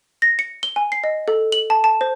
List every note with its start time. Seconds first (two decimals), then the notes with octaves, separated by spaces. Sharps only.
0.22 A#6
0.39 C#7
0.63 G7
0.76 G#5
0.92 C7
1.04 D#5
1.28 A4
1.52 F#7
1.70 A5
1.84 A5
2.01 C5